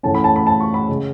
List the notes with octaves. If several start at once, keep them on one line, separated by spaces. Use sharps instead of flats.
A2 E3 A3 C#4 A5
B5
A5
B5
A5
C#6
B5
C#3 G#3